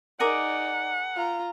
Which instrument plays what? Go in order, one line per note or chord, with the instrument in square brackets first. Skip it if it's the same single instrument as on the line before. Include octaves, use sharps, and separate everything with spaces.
[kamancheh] D#4 D5 [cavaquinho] G#4 A#4 D6 [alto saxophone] F#5
[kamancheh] F4 A#5